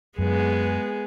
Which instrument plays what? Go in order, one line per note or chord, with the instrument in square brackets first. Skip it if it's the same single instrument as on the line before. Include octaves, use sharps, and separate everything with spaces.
[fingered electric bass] F#2 [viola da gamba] G#3 B3 G#4